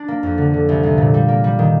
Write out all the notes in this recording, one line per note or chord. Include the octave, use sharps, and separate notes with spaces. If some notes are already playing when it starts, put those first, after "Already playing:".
Already playing: D4
A#3
F2
D3
D3
C2
C2
A#2
G3
A#3
G3
D#3